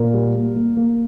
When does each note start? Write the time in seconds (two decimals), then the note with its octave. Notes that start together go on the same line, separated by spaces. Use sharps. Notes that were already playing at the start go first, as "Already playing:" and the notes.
Already playing: A#2 A#4
0.14 G3
0.35 A#3
0.56 A#3
0.77 A#3